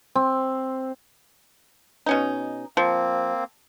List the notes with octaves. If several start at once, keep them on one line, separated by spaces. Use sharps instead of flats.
C4
B2 C#4 D#4
F3 A#3 C4